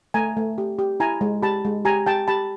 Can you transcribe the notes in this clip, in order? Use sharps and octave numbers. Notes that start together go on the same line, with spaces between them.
A3 G#5 A#5
A3
G4
G4
E4 G#5 A#5
G#3
G4 A5 B5
G#3
G4 G#5 A#5
G4 G5 A5
G4 A5 B5